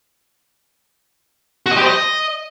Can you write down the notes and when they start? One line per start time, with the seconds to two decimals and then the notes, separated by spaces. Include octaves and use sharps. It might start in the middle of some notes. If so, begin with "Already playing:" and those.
1.66 F#4
1.71 D#5
1.76 G4
1.81 C5
1.86 D#5